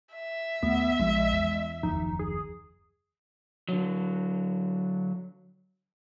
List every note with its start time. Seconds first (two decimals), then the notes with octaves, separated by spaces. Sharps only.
0.15 E5
0.63 D#2 A3 B3
0.99 A#1 F3 G#3
1.32 E2
1.83 F#1 D#2 F3 D#4
2.19 G#4
3.69 D3 F#3